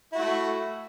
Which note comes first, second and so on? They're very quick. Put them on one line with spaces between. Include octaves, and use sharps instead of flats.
E4 F#4 A3